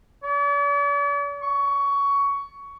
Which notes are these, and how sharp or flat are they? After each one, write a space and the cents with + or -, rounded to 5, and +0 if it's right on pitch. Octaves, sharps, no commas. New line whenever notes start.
D5 -45
C#6 +15